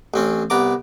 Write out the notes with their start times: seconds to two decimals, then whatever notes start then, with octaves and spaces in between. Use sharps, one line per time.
0.14 A1 C4 C#4
0.50 C2 B3 A#5 D6